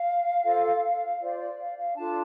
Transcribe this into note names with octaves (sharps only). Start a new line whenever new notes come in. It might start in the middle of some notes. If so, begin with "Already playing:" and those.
Already playing: F5
F4 A4 C5
F4 C5 D5
D5
F5
F5
D4 F4 A4 A5